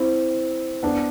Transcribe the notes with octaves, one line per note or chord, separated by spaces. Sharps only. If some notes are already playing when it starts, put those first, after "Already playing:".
Already playing: C4 E4
B3 D4